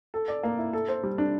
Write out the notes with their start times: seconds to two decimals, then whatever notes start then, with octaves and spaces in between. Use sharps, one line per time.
0.14 A4
0.28 D5
0.43 A#3
0.58 E4
0.73 A4
0.88 C5
1.03 G3
1.18 D4